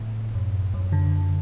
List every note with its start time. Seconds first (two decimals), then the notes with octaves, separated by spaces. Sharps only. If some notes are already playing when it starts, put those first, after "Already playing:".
Already playing: A2
0.34 F#2
0.74 F#2
0.92 D3